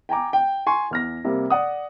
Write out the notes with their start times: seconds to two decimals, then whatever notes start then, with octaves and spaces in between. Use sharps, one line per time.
0.09 G5 G#5 A#5 D6
0.33 G5
0.67 G#5 C6 C#6
0.91 E2 F6 A#6
1.24 C3 G3 A#3
1.50 D5 F#5 D#6